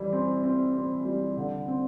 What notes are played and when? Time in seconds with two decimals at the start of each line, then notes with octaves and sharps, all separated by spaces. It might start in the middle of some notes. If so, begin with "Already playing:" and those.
Already playing: E3 G3
0.13 C4
0.43 C4
0.74 C4
1.05 G3
1.37 D3
1.68 C4